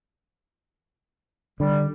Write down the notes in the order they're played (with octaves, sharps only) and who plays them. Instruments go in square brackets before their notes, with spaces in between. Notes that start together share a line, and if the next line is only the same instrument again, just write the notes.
[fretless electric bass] D3 [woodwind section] G3